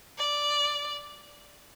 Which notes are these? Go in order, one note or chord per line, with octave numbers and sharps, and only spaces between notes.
D5